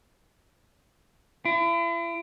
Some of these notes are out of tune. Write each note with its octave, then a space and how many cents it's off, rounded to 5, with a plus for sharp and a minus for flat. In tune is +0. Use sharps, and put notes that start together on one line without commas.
E4 +40